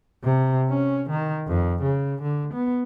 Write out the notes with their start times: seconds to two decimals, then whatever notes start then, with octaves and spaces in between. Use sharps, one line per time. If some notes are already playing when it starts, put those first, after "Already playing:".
0.24 C3
0.69 C#4
1.10 D#3
1.48 F2
1.82 C#3
2.22 D3
2.54 B3